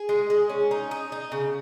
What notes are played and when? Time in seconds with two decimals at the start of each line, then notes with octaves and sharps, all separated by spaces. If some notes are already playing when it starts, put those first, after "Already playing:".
Already playing: G#4
0.09 G#3
0.30 G#3
0.49 C#4
0.71 D#4
0.91 D#4
1.12 D#4
1.32 C#3